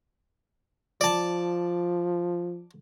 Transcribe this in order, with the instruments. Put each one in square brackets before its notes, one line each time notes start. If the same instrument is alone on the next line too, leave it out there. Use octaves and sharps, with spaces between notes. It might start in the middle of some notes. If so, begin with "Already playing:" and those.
[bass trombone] F3 [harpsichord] D5 A5